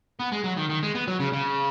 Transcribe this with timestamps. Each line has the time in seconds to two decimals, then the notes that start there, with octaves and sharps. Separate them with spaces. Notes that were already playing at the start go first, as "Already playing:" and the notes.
0.20 B3
0.32 G#3
0.44 F#3
0.57 D#3
0.70 D#3
0.83 G#3
0.95 B3
1.08 F#3
1.20 C#3
1.33 C#3